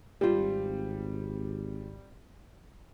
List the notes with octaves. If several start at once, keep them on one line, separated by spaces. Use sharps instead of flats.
G#1 G3 C4 F4